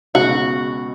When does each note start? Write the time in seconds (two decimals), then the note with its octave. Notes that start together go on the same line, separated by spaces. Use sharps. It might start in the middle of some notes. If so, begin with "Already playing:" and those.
0.14 C#2 B2 G#3 D#4 F#4